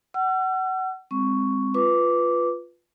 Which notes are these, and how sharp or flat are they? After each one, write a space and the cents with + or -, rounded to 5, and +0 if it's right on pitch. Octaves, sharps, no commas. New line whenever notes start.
F#5 +25 E6 +45
G#3 -30 C4 +0 C#6 +5
F4 +0 B4 +0 D6 -10